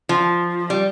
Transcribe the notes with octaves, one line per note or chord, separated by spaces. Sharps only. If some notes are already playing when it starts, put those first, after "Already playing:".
F3
G3